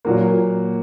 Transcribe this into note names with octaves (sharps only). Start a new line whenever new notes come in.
A#2 F#3 A#3